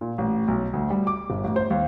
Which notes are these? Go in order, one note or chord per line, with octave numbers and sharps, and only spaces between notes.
A#2
A1
B1
D2
G3
D6
G1
A1
C5
D#2